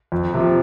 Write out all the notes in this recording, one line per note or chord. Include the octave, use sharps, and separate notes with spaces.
F2
C3 F3